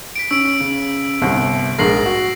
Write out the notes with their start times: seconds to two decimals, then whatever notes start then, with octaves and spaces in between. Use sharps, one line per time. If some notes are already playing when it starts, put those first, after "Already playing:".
0.16 B6 D7
0.31 C#4 E6 D7
0.60 C#3
1.22 G1 C2
1.78 A#1 G#2 A#4 A#6 C7 F#7
2.06 F#4